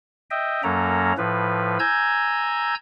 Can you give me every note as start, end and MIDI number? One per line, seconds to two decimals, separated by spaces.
0.31 0.62 75
0.31 0.62 76
0.31 0.62 79
0.63 1.13 42
0.63 1.13 54
0.63 1.13 58
0.63 1.13 61
0.63 1.13 69
0.63 1.13 82
1.18 1.78 45
1.18 1.78 53
1.18 1.78 71
1.79 2.75 80
1.79 2.75 82
1.79 2.75 88
1.79 2.75 91
1.79 2.75 92